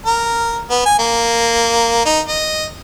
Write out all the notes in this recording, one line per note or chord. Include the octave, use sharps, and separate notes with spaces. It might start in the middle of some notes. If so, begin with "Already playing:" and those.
A#4
B3
G#5
A#3
D#4
D#5